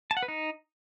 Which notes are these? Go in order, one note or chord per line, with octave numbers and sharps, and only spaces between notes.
A5
F#5
B4
D#4